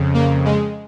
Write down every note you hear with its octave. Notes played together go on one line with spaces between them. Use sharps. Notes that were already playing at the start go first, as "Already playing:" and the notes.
Already playing: F2 C#3
A#3
G#3